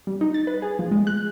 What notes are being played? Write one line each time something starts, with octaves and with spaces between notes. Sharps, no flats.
G3
D#4
A6
B4
G#4
F3
G#3
F#6